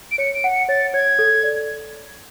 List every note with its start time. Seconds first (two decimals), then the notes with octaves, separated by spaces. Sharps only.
0.11 D7
0.18 C#5 C#7
0.35 D7
0.44 F#5
0.52 C#7
0.69 C#5 A6
0.94 C#5 G#6
1.19 A4
1.43 D5